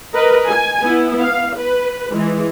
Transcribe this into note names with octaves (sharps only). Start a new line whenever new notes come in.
A#4 B4 D#5
G#5
B3 E4
F5
B4
E3 G#3